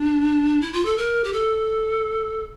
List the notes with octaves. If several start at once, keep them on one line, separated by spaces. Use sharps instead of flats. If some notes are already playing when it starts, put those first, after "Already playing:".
Already playing: D4
E4
F4
A4
A#4
G4
A4